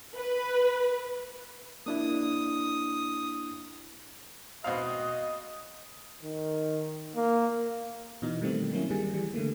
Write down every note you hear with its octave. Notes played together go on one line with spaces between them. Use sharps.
B4
A#3 D4 E4 D#6
B2 C4 D#5 F5
D#3
A#3
B2 E3 D#4
D#3 G3 A3 C4
F#3 A#3 C#4 E4
D#3 G3 G#4
E3 G3
D3 A3 A#3